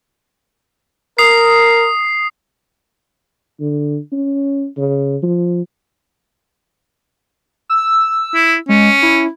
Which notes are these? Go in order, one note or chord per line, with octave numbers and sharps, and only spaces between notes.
A#4 D#6 C7
D3
C#4
C#3
F3
E6
E4
G#3 C#4
E4